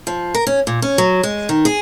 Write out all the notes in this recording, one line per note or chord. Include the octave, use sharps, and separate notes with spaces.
F3
A#4
C#4
A#2
C#4
F#3
G#3
D#3
G#4